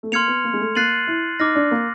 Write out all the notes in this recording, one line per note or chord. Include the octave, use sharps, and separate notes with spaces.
A3
A#3 C6 F6 G#6 C#7 F7
B3
A#3
G#3
A3
A#3 F#6 A6 C7 D#7 F#7
E4
D#4 D6 F6 A#6
D4
A#3